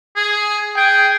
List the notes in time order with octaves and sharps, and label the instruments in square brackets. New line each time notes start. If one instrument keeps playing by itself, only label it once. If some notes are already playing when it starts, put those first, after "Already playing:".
[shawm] G#4
[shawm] G#4 [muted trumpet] G5